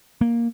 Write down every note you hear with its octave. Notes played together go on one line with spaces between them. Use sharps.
A#3